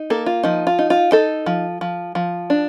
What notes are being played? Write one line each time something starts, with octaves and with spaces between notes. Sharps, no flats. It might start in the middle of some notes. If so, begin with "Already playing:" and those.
Already playing: D#4
A#3 A4
F4
F3 D#4
F4
D#4
F4
D#4 A4
F3
F3
F3
D4